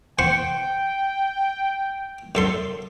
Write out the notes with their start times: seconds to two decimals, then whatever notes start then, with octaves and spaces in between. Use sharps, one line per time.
0.19 C5 F#5 G5 C#6
2.35 F#2 A4 C6